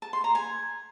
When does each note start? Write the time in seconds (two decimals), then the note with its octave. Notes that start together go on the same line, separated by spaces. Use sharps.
0.02 A5
0.13 C6
0.24 A#5
0.35 G#5